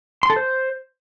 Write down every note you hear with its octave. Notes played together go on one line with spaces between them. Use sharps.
C6
A4
C5